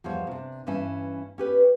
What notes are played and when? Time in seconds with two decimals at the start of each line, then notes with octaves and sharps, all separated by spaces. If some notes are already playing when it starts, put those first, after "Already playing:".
0.04 E2 F3 G3 C#5
0.27 C3 D4
0.67 G2 E3 C#4 E5 A5
1.38 C#4 G4 B4